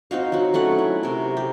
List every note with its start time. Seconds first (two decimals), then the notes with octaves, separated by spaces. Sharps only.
0.11 C4 D#4 F#4 F5
0.32 F#3 F#4
0.54 F#3 A3 C#4 F#5
0.78 E4
1.03 C3 A#4
1.37 G4